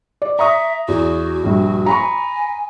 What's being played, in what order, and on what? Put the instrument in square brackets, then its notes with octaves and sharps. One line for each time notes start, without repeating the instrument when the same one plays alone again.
[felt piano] D5
[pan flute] E5 [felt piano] A#5 C#6 D#6
[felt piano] E2 [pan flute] F#4
[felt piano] A#1 G2
[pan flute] G#5 [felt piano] A#5 B5 C#6